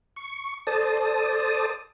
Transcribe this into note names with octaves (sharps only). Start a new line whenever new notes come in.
C#6
A4 C5 D5 A5 D#6